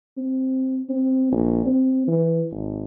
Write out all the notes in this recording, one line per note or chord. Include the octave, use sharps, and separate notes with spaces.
C4
C4
A#1
C4
E3
G#1